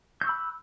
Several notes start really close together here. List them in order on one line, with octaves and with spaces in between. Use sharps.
G6 C#6 E6 B5 F#6